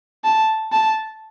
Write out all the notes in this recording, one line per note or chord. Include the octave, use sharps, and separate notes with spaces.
A5
A5